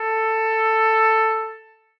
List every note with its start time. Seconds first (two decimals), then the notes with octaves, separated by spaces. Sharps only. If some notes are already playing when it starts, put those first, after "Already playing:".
Already playing: A4